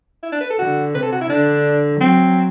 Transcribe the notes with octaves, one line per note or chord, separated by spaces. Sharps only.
E4
D4
B4
A4
D3 F#4
C3 B4
A4
F#4
E4
D3 D4
F#3 C4